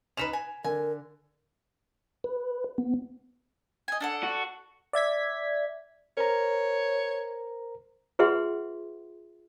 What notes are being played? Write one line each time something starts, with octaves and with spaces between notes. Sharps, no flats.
C#4 D#4 B4 B6 E7 F7
G#5
D3 A#4 G#5
B4
B3
D#5 G#5
D4 A4 F#5
F#4
D5 E5 G#6 B6
A#4 C5 C#5 A#5
F4 G#4 B4 E5 F#5 C6